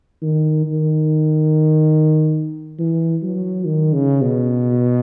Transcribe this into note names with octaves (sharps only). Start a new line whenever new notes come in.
D#3
D#3
E3
F#3
D#3
C#3
B2